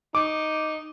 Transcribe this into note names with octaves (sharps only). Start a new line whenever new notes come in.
D#4 D6